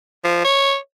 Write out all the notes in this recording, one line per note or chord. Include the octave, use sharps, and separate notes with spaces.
F3
C#5